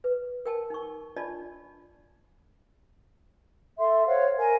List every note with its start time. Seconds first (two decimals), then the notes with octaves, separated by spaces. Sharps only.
0.04 B4
0.46 A#4 G5 A5
0.70 D#4 C#6
1.16 D4 F4 D5 D#5 A5 B5
3.77 A4 E5 C6
4.06 C5 C#5 F5 F#5
4.37 A#4 G#5